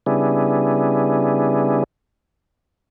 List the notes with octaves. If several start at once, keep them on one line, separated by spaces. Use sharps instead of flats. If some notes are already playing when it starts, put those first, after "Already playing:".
C#3 G3 B3 D4 E4 G#4